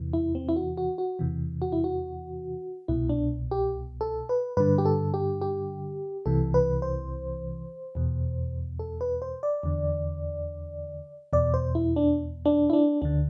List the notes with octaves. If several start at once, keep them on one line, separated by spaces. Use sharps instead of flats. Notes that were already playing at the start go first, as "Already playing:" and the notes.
Already playing: E2 C3 E3
E4
C4
E4
F#4
F#4
F#4
E2 C3 E3
F#4
E4
F#4
C2 B2 E4
D4
G4
A4
B4
G2 D3 B4
G4
A4
G4
G4
C2 C3 E3 A4
B4
C5
E2 B2
A4
B4
C5
D5
E2 D3
E2 B2 D5
C5
E4
D4
D4
E4
D4
D2 D3 D4